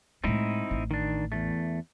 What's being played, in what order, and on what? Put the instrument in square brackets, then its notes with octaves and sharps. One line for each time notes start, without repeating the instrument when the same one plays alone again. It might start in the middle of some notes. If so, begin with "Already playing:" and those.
[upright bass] A2 G#3 [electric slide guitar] C4 D#4 E4
[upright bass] A1
[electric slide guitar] D#3 D4
E2 G2 A3